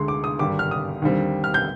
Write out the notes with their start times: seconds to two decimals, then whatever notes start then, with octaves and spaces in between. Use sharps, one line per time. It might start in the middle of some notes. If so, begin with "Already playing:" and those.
Already playing: D2 D3 G#3 C6
0.08 D6
0.24 D#6
0.39 G#1 G2 D3 G3 D6
0.59 F6
0.71 D#6
1.02 D#2 D3 G3 C4
1.44 F6
1.54 G6